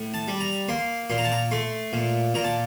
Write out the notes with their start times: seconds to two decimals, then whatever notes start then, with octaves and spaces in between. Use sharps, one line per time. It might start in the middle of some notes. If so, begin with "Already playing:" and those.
Already playing: A2
0.14 A5
0.28 G3
0.41 A#5
0.69 A#3 C6
1.10 A#2 C6
1.18 A#5
1.24 A5
1.32 A#5
1.51 A3 C6
1.93 A#2
2.34 A#2 A#5
2.44 A5